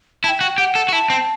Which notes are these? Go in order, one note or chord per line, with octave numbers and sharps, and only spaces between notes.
E4 A5
G5
F#4
G4 F#5
A4
F#4
E4 A5
C4